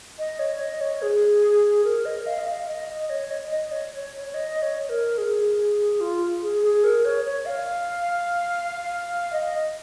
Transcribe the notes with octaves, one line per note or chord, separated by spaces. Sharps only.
D#5
C#5
D#5
C#5
G#4
A#4
D#5
F5
D#5
F5
D#5
D#5
C#5
D#5
D#5
C#5
C#5
C#5
D#5
C#5
A#4
G#4
F4
G#4
G#4
A#4
C#5
C#5
F5
D#5